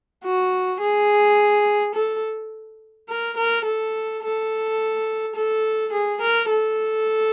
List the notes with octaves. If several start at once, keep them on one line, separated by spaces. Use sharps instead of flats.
F#4
G#4
A4
A#4
A#4
A4
A4
A4
G#4
A#4
A4